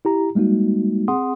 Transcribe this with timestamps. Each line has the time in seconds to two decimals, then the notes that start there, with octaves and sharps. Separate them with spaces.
0.05 E4 G4 A#5
0.35 G3 G#3 A#3 D#4 F#4
1.08 C4 G#4 F#5 C6 D#6